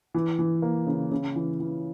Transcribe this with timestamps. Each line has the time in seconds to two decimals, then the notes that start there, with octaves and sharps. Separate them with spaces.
0.14 E3
0.39 E3
0.62 A#3
0.87 C#3
1.11 C#3
1.36 E3
1.60 E3